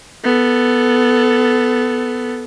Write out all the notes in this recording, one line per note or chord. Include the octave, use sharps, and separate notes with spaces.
B3 A4